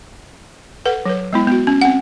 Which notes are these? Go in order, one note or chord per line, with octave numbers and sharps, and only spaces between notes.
A4 B4 F#5
F#3 B4
G#3 B3 E4
B3 F#4
C#4
C4 F#5